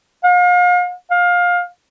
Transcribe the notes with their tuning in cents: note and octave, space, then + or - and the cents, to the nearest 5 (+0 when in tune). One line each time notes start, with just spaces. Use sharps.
F5 +40
F5 +20